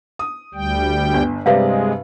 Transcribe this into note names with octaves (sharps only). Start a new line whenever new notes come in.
D#6
D2 G3 G5
G1 D4
G2 C3 G#3 B4 D5 E5 F5